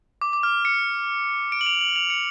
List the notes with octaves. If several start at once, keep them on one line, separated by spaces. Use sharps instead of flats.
D6
D6
F6
C#7
D7
F#7
F7
F#7
F7
C#7